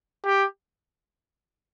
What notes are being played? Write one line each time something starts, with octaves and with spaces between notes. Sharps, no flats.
G4